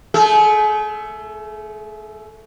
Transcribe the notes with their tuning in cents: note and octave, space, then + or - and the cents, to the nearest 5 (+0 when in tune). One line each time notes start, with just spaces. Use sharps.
A3 +10 G#4 +40